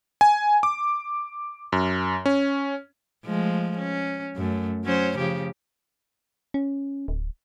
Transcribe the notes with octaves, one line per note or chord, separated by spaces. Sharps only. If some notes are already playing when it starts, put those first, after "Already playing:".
G#5
D6
F#2
C#4
F3 G#3 A3
C#4
F#2 A3
F#3 C#4 C5
C#3 F3 G4
C#4
D1